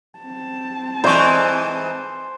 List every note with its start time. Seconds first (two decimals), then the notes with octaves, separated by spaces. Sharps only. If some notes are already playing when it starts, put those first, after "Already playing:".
0.19 C4 A5
1.04 G#2 E3 C5 D5 E5 C#6